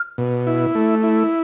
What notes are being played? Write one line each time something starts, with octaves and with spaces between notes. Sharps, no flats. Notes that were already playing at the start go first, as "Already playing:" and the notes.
Already playing: F6
B2
E4
A3
E4